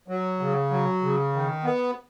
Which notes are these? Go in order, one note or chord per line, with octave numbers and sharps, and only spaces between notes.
F#3
C#3
F#3
C#3
D#3
B3